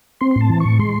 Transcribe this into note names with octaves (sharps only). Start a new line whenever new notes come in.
C4 C6
C6
A2 A5
E3
A2 C#6
G#3 C6